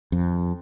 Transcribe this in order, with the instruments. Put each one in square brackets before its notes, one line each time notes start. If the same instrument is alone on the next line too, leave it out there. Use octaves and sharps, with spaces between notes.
[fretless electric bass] F2